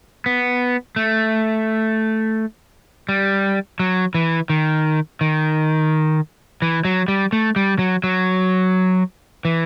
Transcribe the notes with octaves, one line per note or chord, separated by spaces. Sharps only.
B3
A3
G3
F#3
E3
D#3
D#3
E3
F#3
G3
A3
G3
F#3
F#3
E3